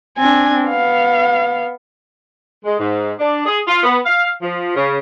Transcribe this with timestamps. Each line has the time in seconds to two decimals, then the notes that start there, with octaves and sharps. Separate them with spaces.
0.18 C4 D4 G#5
0.69 B3 F5
2.64 G#3
2.79 G#2
3.19 D4
3.45 G#4
3.67 F4
3.83 B3
4.06 F5
4.41 F3
4.76 C#3